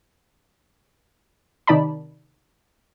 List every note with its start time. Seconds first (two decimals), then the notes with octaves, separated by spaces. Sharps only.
1.67 C3 D#3 D#4 D5 A5 B5